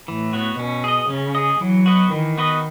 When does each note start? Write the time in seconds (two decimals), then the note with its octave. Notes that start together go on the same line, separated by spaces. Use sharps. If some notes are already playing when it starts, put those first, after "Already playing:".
0.08 A2 E3
0.33 B3 F#4 C#5
0.58 B2 C#4
0.84 G#4 D#5
1.10 C#3 C#4
1.35 G#4 D#5
1.61 E3 F#3
1.86 B3 F#4 B4 D#5
2.12 D#3 E3
2.38 B3 F#4 B4 D#5